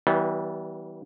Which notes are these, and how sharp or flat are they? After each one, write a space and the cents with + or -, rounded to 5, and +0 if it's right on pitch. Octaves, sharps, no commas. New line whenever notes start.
E3 -35 G3 -35 B3 +0